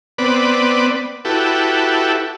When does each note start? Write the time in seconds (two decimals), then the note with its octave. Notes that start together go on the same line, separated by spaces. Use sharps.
0.18 B3 C4 B4 D5
1.25 E4 F#4 G4 A4 B4